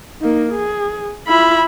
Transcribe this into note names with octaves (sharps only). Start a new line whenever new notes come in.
A#3 D#4
G#4
E4 F4 B5